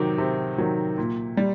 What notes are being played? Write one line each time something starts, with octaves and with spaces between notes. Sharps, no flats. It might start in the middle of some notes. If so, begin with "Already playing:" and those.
Already playing: C3 D#3 F#3 D6
C3
D#3 F#3
A#2
G3